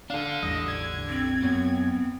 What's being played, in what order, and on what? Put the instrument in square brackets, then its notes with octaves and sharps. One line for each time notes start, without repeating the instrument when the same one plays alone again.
[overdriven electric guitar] D4 A4 [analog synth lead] F5
[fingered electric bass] A1 E2 G3 [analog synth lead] D#5
[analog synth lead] G#6
[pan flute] C4
[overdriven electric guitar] F#2 [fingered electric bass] B3